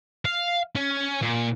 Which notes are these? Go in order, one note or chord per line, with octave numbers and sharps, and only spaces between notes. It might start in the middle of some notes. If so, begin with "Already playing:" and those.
F5
C#4
A#2